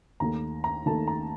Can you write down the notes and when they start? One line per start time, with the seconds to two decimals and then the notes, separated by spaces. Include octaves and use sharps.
0.20 D#2 D#3 A3 A#5
0.64 A#5
0.86 D#2 D#3 A3 A5
1.07 A#5